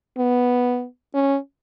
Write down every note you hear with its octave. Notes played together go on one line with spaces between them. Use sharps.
B3
C#4